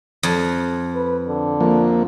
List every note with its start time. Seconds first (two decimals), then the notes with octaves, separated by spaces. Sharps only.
0.23 F2
0.95 B4
1.27 D3
1.61 F3 A#3